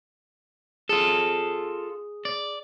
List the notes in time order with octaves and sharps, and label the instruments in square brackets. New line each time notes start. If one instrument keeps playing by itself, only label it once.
[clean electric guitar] F4 A4 [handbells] G#4
[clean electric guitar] D5